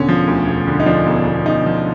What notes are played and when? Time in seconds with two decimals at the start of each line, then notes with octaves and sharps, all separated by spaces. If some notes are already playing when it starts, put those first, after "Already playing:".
Already playing: E1 D3 C#4
0.09 F3
0.27 D2
0.47 E1
0.67 D3
0.80 D#4
0.86 F3 D4
1.07 E1
1.26 E1
1.46 E1 D#4
1.66 F3